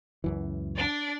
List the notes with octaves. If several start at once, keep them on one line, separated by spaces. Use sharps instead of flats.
C#2 F#2 E3
D4 D5